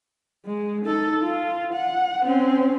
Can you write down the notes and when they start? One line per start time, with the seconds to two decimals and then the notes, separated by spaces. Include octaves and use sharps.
0.45 G#3
0.85 D#4 A4
1.23 F4
1.73 F#5
2.26 C4 C#4